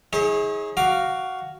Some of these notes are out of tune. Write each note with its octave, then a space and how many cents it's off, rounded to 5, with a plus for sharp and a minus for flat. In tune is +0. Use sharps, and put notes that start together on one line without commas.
D#4 +45 G#4 +0 C#5 -25
F#4 +10 F5 +0 D6 +10